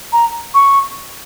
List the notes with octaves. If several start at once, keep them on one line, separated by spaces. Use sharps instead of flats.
A#5
C#6